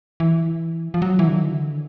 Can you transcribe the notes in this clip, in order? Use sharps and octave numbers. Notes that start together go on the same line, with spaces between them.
E3
F3
F#3
E3
D3
D#3
D3